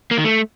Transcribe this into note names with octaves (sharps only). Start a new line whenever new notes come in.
A#3
D#3
A3